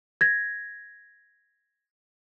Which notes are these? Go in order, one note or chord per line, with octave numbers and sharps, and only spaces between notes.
G#6 A#6